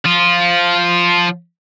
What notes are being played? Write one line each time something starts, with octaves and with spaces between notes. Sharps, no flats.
F3 F4